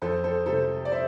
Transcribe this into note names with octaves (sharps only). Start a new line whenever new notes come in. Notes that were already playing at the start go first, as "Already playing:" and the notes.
F2 A4 C5
A4 C5
C3 G3 A4 C5
D5
C5 E5